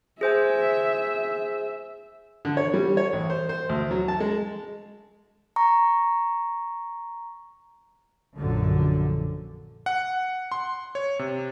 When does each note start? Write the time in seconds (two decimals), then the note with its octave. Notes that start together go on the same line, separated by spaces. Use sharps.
0.21 G#4 C5 E5 G#5
2.45 D3
2.57 C#5
2.74 G3
2.97 C#5
3.13 A1
3.30 C5
3.49 C5
3.69 D2
3.91 F#3
4.08 A5
4.20 G#3
5.56 A#5 C#6
8.35 A#1 F#2 D3
9.86 F#5
10.52 C6
10.95 C#5
11.19 C3